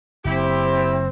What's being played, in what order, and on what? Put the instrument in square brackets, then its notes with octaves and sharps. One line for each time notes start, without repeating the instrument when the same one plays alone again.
[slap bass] F#1 [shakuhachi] C4 [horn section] E4 G4